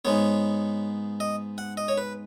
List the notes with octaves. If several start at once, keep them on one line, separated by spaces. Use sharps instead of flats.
G#2 G#3 B3 C#5
D#5
F#5
D#5
C#5
B4